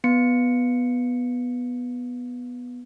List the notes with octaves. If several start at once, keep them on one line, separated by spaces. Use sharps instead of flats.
B3 C#7